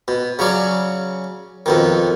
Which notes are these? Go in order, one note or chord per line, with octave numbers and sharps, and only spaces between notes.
B2
C#3 F#3 C#4 D5
F2 B2 D#3